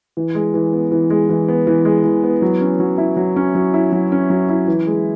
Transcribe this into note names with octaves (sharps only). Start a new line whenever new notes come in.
E3
G#3
E3
B3
E3
G#3
E3
B3
E3
G#3
E3
B3
F#3
C#4
F#3
E4
F#3
C#4
F#3
E4
F#3
C#4
F#3
E4
E3
G#3